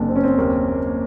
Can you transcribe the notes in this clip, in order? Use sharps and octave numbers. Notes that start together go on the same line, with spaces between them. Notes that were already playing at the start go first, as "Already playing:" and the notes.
Already playing: F#1 C3 D4
C4
C#4
C4
D#2 A#3